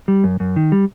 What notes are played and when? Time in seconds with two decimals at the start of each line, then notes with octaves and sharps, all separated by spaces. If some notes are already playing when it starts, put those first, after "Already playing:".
0.08 G3
0.24 F#2
0.40 F#2
0.56 D#3
0.72 G3